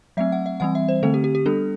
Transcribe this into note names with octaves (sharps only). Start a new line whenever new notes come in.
F#3 A3 C4 E5
F#5
E5
E3 G3 C4 F#5
E5
C5
D3 A3 C4 A4
G4
G4
G4
G3 B3 D4 A4